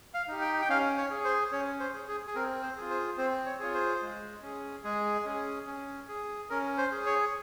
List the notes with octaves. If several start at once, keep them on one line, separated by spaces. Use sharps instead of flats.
F5
D#4 G4
G5
G5
C#4 F5
C#5
G#4
C5
C#4 C#5
C5
G#4
G#4
G#4
C4 A#4
C5
F4 G#4
C5
C4 C5
C#5
F4 G#4 C#5
C5
G#3
C#4 G#4
G#3 G#4
C#4 G#4
C#4
G#4
C#4 A#4
C5
G#4
C#5